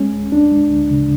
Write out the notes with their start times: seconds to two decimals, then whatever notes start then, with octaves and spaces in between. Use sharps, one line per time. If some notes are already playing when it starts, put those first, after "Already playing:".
Already playing: G#3 C#4
0.12 D2
0.32 E2 D4
0.51 G#3
0.71 D2
0.91 C#3